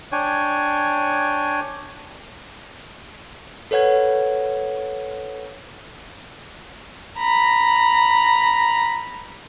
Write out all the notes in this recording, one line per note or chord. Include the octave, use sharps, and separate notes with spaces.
D4 C#5 G5 G#5
A4 B4 C#5 F#5 G#6
A#5 B5